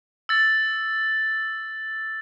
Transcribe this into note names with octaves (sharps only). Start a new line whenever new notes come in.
E6 A6